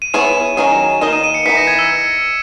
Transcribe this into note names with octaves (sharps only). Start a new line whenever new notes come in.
D#7
B3 E4 G#4 C#5 E7
D#3 F#3 C#4 G#4
D#3 A#3 D#4 A#4 D#5 E7
D#7
D#7
C#7
E3 B3 D#4 B6
A#6
G#6
E6